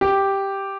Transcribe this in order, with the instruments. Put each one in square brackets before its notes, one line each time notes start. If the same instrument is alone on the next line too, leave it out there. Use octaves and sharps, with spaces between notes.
[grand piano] G4